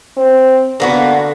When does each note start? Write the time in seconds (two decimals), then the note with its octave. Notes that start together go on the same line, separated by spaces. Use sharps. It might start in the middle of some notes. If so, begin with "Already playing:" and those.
0.17 C4
0.80 D3 A#3 B3 F#4